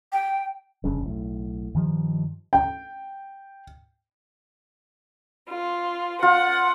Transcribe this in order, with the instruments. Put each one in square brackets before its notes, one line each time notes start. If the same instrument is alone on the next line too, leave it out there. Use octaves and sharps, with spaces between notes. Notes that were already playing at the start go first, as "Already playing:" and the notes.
[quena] G5
[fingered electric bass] F1 G2 C#3
B1 A2
G2 D#3 F3 G3
[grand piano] G5
[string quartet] F4
[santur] F4 [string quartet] F#5